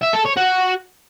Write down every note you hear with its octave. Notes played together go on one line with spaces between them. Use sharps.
E5
A4
C#5
F#4